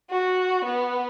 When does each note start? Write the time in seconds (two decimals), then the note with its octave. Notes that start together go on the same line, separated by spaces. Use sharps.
0.10 F#4
0.65 B3